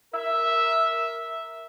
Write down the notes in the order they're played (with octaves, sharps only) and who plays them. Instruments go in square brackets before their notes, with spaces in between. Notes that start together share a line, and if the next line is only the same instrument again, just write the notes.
[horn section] A#4 E5